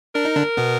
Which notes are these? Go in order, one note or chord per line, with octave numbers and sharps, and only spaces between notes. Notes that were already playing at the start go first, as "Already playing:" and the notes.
D4 A#4
D#4
D3 D4
B2 B3